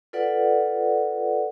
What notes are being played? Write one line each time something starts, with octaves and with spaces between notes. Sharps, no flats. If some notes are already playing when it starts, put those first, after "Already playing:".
F4 A4 B4 D5 F#5